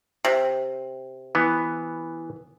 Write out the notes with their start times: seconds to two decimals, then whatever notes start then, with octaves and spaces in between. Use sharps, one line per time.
0.25 C3
1.35 E3 B3